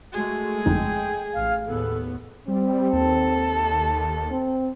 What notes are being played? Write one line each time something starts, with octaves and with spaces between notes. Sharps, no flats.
G#3 A3 F#4 G#4
G1 F2 D#4 G5
A1 F5
D#2 A2 B3 A4
G3 C4
D#2 A4
C4